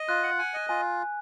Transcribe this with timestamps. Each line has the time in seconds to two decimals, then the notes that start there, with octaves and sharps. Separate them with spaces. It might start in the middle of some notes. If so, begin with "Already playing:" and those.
Already playing: D#5
0.08 F4 F#6
0.23 F#5
0.39 G#5
0.54 D#5
0.69 F4 G#5